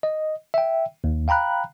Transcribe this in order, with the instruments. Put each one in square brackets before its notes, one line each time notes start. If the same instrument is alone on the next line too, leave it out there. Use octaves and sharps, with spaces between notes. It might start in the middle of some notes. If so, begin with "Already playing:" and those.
[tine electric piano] D#5
E5 G5
D#2
F5 G5 A#5 B5 F#6